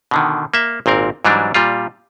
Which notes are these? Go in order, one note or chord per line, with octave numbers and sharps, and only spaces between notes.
B2 D3 D#3
A#3 E5
G#1 A#2 C4 A#4
G#2 E3 F#3 G3 D4
A#2 G3 F4